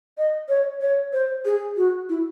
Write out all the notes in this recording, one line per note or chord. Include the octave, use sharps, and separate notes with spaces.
D#5
C#5
C#5
C5
G#4
F#4
E4